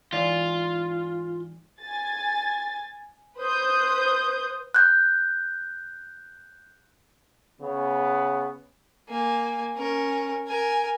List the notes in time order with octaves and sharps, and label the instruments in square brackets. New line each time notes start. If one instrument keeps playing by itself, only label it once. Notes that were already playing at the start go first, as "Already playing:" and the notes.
[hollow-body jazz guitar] G#2 E3 D5 [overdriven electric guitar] F4
[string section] G#5 A6
B4 C5 D#6 G6
[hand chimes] F#6 G6
[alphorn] C#3 [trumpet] B3
[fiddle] A#3 G#5
C#4 A#4
A#4 G#5